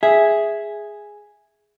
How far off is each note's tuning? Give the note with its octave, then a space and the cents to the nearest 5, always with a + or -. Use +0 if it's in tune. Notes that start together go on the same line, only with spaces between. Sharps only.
G#4 +0 E5 +0